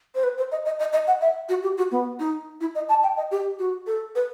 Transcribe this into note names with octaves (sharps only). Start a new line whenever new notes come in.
C5
B4
C5
D#5
D#5
D#5
D#5
F#5
E5
F#4
G4
F#4
B3
D#4
E4
D#5
A5
G5
D#5
G4
F#4
A4
B4